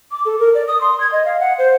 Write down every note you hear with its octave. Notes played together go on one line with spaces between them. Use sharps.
D6
A4
A#4
D5
D#6
C6
G#6
D#5
F5
F#5
C5